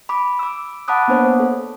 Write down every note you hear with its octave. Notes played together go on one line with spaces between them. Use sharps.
B5 D6
D6 E6
F#5 A5 B5 D6 D#6 F#6
A#3 B3 D4 C5 C#5 F#5
A4